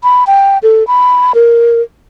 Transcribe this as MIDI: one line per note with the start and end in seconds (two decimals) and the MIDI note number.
0.03 0.24 83
0.27 0.58 79
0.63 0.86 69
0.87 1.32 83
1.34 1.81 70